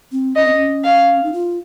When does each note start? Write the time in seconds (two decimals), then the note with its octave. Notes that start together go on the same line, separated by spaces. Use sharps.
0.12 C4
0.36 C#4 D#5
0.45 C4
0.54 C#4
0.84 F5
1.23 D#4
1.33 F4